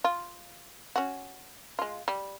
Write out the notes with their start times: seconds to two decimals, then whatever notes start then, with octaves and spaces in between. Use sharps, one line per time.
0.04 F4
0.96 C#4 F#4
1.79 G#3 F4
2.08 G3